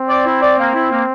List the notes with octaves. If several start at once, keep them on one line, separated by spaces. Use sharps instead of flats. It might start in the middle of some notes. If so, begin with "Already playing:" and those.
Already playing: C4
D5
E4
D5
A#3
E4
A#3